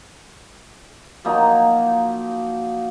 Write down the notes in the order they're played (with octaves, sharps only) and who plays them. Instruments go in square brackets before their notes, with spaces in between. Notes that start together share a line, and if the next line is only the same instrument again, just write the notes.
[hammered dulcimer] F3 F#3 A#3 D#4